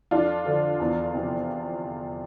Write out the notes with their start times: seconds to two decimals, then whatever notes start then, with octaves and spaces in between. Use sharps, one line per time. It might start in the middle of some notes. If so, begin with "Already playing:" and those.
0.11 F2 D4 F4
0.46 D3 F3
0.80 E2
1.14 C3 F3